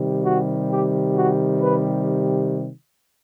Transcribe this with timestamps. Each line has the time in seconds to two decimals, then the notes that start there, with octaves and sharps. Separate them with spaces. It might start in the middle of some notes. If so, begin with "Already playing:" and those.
Already playing: C3 D#3 G3
0.24 F#4
0.69 G4
1.15 F#4
1.61 B4